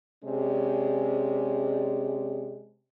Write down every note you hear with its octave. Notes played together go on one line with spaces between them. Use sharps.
C3 G#3 C#4 D5